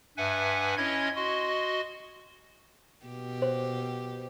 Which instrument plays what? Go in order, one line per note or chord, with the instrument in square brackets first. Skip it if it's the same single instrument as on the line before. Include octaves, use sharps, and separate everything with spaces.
[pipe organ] G2 B4 E5 F#5 G#5
C#4 E4 C#5 D#5 C6 G#6
F#4 D#5 C6
[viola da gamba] B2 G4
[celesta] C5